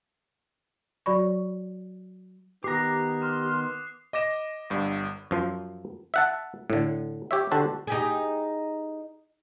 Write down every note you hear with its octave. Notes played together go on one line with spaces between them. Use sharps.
F#3 F#4 D5 B5 C#6
D#3 B3 G4 A#5 D#6 F#6 C7
C6 D6 F6
D#5 D6 A#6 E7
G1 G2
F#2 F3 C5
E5 F#5 A5
A2 D3
G4 C#5 E5
D3 D4 F#4 G4 A4 C5
D#4 G4 G#4